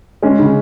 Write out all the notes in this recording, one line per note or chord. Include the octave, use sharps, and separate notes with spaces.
G#3 C#4
C#3